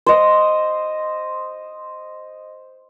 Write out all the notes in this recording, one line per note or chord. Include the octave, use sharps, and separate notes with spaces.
C5 D#5